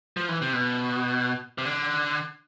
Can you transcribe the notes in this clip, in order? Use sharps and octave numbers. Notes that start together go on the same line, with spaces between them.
F3
E3
C3
B2
C3
D3